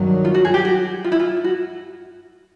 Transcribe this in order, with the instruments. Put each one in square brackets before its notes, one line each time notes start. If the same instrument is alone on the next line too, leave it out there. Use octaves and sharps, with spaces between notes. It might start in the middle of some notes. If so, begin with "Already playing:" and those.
Already playing: [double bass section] G2 D#3 F#3
[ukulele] F4
F#4
G#4
G4
F#4
F4
E4
F4
F#4